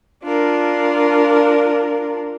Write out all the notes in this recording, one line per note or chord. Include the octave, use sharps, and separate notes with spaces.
D4 F4 A#4